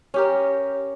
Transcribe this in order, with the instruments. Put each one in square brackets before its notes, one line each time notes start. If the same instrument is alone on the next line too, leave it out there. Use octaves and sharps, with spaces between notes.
[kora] C#4 G4 A#4